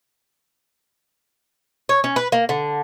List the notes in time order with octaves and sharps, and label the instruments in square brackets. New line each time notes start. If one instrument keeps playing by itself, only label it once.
[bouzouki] C#5
C#4
B4
A#3
D3